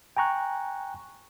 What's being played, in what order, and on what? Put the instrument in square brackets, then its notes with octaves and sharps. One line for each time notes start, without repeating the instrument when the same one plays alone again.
[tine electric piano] G5 G#5 A#5 C#6 F#6